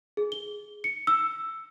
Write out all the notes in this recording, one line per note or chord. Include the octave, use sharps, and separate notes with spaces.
G#4
G7
C#7
E6